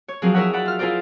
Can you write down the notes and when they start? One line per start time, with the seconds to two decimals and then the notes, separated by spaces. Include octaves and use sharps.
0.08 C#5
0.22 F3 F#3 C4 G#4 A#4
0.34 E4 G#4 A#4 C#5 E5 F#5
0.53 D5 F#5 B5
0.65 F4 F6
0.79 E4 F4 G#4 A#4 C5 D5